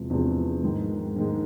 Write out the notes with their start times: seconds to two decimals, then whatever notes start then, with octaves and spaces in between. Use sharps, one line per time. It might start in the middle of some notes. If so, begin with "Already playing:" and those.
Already playing: E2 C3 F3 G#3
0.10 E2 C3 F3 G#3
0.62 G#2 D#3 G#3
1.16 G#2 D#3 G#3